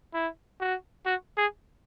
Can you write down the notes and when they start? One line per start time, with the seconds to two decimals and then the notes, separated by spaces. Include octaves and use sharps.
0.14 E4
0.61 F#4
1.06 F#4
1.37 G#4